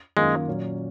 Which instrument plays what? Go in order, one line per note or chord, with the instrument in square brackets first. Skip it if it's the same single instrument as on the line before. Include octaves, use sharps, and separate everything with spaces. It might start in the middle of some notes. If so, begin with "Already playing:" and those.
[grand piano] F#2 D#3 A#3 F4 [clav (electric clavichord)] G#3
[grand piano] A#2 F#3 C#4